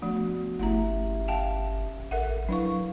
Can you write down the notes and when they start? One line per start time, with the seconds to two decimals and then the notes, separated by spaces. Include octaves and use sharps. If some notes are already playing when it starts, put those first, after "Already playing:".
0.02 F3 A3 B3 D4 F#4
0.59 G1 A3 C#4 E4 G4 E5 A#5
1.28 F5 G5 A5
2.11 A1 A4 A#4 E5 F#5
2.49 F#3 D4 E4 B4 F5 C#6